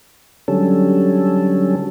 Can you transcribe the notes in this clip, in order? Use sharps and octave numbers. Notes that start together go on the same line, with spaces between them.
D3 F#3 G3 C#4 A4